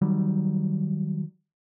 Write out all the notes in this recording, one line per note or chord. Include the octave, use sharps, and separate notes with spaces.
D#3 F#3 G3